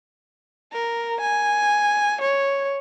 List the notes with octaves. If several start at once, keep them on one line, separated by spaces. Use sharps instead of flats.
A#4
G#5
C#5